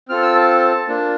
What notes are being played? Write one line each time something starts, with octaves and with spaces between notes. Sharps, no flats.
C4 F4 A4 F6
E6
A5
A#3 D4 F4 A5